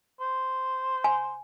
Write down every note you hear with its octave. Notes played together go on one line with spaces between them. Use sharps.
C5
G#5